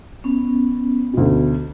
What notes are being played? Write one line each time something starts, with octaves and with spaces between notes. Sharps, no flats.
B3 C#4
D2 B2